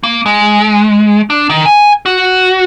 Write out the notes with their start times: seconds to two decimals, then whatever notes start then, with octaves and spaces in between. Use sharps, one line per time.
0.03 A#3
0.26 G#3
1.30 D4
1.49 D#3
1.66 G#5
2.06 F#4